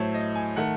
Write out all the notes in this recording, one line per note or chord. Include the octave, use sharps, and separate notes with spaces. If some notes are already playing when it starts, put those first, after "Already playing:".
Already playing: A2 F#3 A3 C5 C#5
D#5
G#5
D#3 A3 F#5